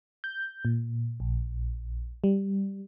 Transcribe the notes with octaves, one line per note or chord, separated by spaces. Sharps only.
G6
A#2
A#1
G3